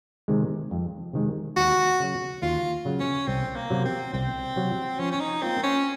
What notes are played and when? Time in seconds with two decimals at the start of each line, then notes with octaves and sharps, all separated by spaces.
0.28 C3 D#3 G#3
0.71 F2
1.13 C3 D#3 G#3
1.56 D#2 F#4
1.99 C#3 F#3
2.42 D#2 F4
2.85 C#3 F#3
3.00 C#4
3.27 C2 C4
3.56 A#3
3.70 C3 F#3
3.85 C4
4.13 C2 C4
4.56 C3 F#3
4.99 F3 C#4
5.12 C#4
5.20 D#4
5.42 A#3 C4 F4 A#4
5.63 C#4